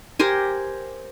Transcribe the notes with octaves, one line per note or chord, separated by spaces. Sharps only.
G4 A#4 C5 G#5